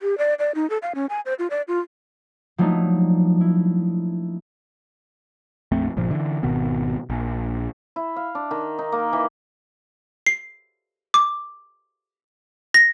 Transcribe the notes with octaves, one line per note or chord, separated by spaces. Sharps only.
G4
D5
D5
D#4
A4
F5
C#4
G#5
C5
F4
D5
F4
F3 F#3 A3 A#3 D4 D#4
E4
A#1 F2 A3 C4
G1 A#2 F3
D3 E3
G#1 B2 D#3 B3
A#1
E4
F5
D4
D#3
D#4
A#3
E3
C7
D6
A#6